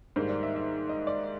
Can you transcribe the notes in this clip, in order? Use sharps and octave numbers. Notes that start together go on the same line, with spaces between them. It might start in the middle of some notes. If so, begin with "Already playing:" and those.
G#2 D#3 G3 A#3 C5
D5
E5
E5
D#5
D5